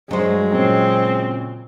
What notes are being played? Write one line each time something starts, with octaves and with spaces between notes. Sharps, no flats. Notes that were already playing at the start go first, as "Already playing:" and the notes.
G2 F#3 G#3 C5
A#2 C#3 C4 C#5